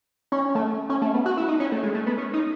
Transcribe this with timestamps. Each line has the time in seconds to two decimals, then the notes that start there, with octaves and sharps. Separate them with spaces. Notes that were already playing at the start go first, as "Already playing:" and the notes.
0.32 C#4
0.55 A3
0.89 C#4
1.02 A3
1.14 B3
1.26 F#4
1.37 E4
1.48 D#4
1.60 C#4
1.72 A3
1.83 G#3
1.94 A3
2.07 B3
2.18 C#4
2.33 D#4